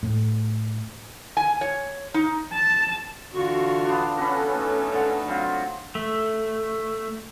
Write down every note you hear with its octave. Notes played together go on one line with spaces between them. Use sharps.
A2
G#5
C#5
D#4
A5
D3 E3 F4 F#4 C#6
B3 D4
B3 C#4 F#4 A4 B4
A3 D#4
D3 F#5
F#3 C4 F4
A3